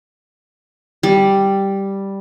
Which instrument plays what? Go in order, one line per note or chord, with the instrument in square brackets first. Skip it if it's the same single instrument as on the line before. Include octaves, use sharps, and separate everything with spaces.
[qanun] G3